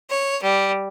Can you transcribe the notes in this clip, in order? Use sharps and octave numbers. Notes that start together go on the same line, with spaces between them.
C#5
G3